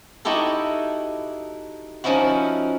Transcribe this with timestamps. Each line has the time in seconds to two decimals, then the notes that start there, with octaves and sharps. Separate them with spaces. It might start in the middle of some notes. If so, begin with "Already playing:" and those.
0.25 D#4 E4 F#4 G4 A4
2.04 F3 C#4 D#4 E4 F#4